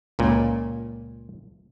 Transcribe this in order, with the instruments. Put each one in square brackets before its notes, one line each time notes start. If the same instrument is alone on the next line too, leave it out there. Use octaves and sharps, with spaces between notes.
[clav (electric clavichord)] C#2 A#2